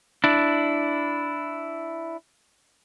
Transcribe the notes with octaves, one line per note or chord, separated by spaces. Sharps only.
D4 E4